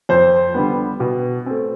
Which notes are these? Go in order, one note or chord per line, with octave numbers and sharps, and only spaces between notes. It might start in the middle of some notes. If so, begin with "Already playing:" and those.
F2 C5
D3 G3 B3
B2
A3 C4